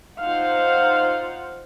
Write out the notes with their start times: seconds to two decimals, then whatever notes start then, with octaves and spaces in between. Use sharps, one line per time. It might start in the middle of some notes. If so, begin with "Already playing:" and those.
0.19 D#4 F4 C5 F5 F#5